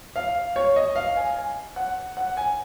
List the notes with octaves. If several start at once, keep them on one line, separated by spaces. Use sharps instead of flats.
F5
C#5
D#5
F5
G#5
G#5
F#5
F#5
G#5